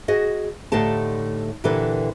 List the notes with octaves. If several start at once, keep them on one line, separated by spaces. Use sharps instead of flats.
F#4 G#4 D#5
A2 D3 A3 D#4 G4 A5
A#2 D3 E3 G4 A4 B4